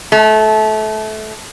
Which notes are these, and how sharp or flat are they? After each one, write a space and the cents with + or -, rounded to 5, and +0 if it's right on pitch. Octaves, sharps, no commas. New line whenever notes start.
A3 -25